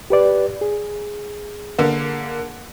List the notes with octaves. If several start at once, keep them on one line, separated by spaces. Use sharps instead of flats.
G4 B4 D5
G#4
D3 A#3